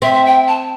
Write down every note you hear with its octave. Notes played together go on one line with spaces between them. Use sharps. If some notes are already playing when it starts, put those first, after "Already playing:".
C4 E5
E5
G5
A5